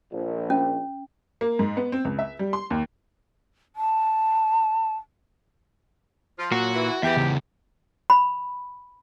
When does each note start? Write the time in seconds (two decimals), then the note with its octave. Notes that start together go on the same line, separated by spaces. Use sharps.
0.12 A#1
0.50 C#4
1.41 A#3
1.59 G#2
1.77 B3
1.92 C4
2.05 C#2
2.19 E5
2.39 G3
2.53 C6
2.70 D#2
3.76 A5
6.38 F3 F4
6.52 A#2 F#3 F#4
6.74 E3
7.03 E2 G3 E4 G4 B4 E5
7.17 C#3 B3
8.10 B5